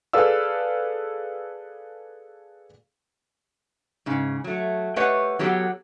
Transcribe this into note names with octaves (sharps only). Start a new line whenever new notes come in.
G#4 A4 B4 D5 F5 E6
G#2 C#3
F#3 A3
A3 G4 B4 C#5 D#5 F#5
F#3 B3 G4 A4